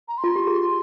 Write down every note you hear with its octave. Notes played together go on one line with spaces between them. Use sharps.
A#5
C6
F4
G4
G#4